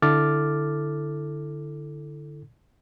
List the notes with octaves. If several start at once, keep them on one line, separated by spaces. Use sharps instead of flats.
D3 E4 A4 D6 F6 A6